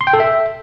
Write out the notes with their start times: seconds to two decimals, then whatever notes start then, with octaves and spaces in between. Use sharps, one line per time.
0.01 C6
0.07 G5
0.13 A4
0.20 E5